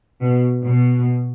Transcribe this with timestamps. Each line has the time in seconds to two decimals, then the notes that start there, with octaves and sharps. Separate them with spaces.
0.22 B2
0.65 B2